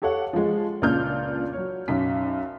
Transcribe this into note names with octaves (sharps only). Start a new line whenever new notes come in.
G4 A4 C#5 F5 F#5
F3 G#3
C#2 A#2 A#3 D4 F6 G6
F#3 C#5
B1 F#2 B6